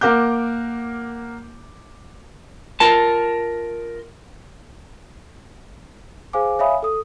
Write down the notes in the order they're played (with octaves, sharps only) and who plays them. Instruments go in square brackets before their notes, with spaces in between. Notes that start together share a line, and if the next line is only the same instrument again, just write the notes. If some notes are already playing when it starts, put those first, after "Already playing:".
[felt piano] A#3 A#4 F#5 D6 G6
[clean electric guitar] F4 A#4 A5
[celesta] G#4 C5 F5 G#5 D6
C#5 E5 F5 G#5 B5 D#6
A4 D#6